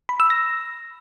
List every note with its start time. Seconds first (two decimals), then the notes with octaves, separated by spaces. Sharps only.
0.09 B5
0.20 E6
0.30 A#6